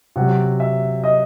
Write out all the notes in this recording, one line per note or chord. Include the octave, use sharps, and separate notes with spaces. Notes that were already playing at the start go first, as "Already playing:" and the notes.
C3 F#3 F#5
E5
D#5